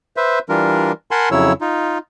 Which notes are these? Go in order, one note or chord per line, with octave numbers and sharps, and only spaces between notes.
B4 C5 E5
E3 G3 D4 F4 A#4
A#4 F#5 G#5 A5 B5 C6
F2 C#3 F#3 E4 C#5 E6
D#4 F4